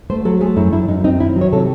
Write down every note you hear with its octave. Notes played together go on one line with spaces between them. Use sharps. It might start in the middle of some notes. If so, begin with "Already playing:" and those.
A3 C5
F#3 A4
A3 G#4
F#2 E4
F#2 E4
F#2 D#4
C4 D#4
D#3 E4
F#3
C#5
C3 A4